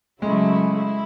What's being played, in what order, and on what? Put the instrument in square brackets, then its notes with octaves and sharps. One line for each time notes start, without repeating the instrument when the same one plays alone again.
[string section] C#3 F#3 A3 E4 [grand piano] G#3
[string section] E4